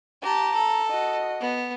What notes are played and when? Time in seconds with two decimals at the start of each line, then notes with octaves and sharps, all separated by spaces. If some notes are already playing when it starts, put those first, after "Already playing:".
0.22 G4 A5 A#5
0.54 A4
0.90 F#4 D#5
1.41 B3